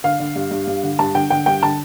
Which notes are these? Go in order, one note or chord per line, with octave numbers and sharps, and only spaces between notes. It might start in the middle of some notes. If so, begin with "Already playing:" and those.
D3 F5
D3
G2
G2
G2
D3
G2 A5
D3 G5
D3 G5
G2 G5
D3 A5